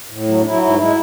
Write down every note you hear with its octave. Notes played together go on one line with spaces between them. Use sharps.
A2
F#3
D4
F#3 E4
G#2 E4
G#3 E4